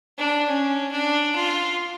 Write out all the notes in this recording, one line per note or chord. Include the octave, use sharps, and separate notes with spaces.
D4
C#4
D4
F4